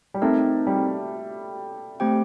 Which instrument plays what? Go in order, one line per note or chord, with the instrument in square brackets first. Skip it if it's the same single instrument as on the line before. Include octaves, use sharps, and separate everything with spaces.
[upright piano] G3
[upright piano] A3 [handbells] C4 D#4 A#4
[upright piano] G3
[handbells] A3 C4 G4 C5 G5